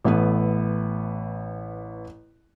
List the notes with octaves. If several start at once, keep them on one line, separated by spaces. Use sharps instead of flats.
A1 A3 B3 B4